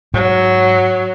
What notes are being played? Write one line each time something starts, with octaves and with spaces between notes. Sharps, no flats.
G#2 F#3